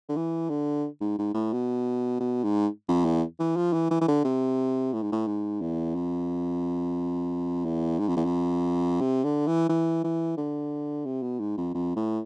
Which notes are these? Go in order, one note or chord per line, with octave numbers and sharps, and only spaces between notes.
D3
E3
D3
G#2
G#2
A2
B2
B2
G#2
F2
E2
E3
F3
E3
E3
E3
D3
C3
A2
G#2
A2
G#2
E2
F2
E2
G#2
F2
E2
F2
C3
D3
E3
E3
E3
D3
C3
B2
G#2
F2
F2
A2